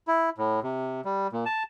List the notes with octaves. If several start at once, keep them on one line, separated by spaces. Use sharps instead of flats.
E4
A2
C3
G3
A#2
A5